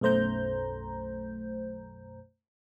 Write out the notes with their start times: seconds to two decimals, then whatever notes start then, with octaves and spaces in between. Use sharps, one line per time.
0.01 B1 F#2 A3 C5 A#5 G6